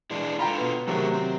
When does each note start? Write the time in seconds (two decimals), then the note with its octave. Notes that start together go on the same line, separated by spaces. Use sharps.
0.11 E3 G#3 D4
0.39 D3 F4 G5 A#5 B5
0.58 B2 B4
0.87 C3 D#3 F#3 A3 G#4 A#4
1.14 C4